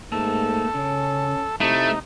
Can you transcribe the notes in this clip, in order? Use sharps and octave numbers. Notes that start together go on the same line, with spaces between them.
G#2 A3 A#3 A4
C#3 C#4
C3 A3 D#4 E4